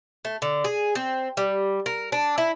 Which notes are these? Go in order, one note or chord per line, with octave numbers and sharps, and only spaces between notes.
A3
D3
G#4
C4
G3
A#4
D4
E4